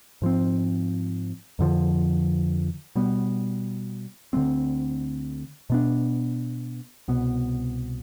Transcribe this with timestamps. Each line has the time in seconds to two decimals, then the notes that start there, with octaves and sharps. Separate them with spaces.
0.22 G#2 F3 C4
1.59 F2 D3 F3
2.96 B2 G3 B3
4.33 D2 D3 G#3 C4
5.70 B2 B3 D4
7.08 C2 B2 B3